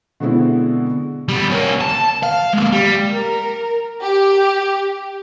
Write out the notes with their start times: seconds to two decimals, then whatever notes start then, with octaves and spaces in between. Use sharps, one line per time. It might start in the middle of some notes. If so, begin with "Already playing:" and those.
0.20 B2 D3 G#3 B3 C4 E4
1.29 G3 B3
1.50 A#3 C#4
1.81 A5
2.23 F5
2.54 G#3 A#3
2.73 G3
3.11 A#4
4.01 G4